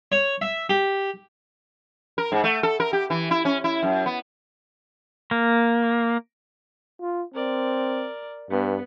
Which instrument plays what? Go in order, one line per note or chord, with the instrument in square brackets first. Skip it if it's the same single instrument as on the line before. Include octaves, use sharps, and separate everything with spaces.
[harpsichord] C#5
E5
G4
[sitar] A#4
G#2
A3
A4
A#4
G4
E3
E4
C#4
E4
F#2
B3
[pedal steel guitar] A#3
[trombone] F4
[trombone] C4 [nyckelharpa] A#4 D5
[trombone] G2 [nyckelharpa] B3